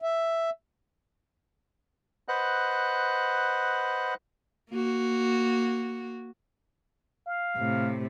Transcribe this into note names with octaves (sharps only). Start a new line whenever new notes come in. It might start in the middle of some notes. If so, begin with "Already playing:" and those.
E5
B4 C5 D#5 F#5 F#6
A#3 F#4
F5
A2 C3